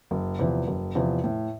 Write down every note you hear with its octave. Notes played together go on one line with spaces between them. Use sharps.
F#1
E2 C3 F3
F#1
E2 C3 F3
A2